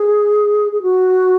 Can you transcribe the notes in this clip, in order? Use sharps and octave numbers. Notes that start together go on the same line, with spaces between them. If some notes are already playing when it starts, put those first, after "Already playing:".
Already playing: G#4
G#4
F#4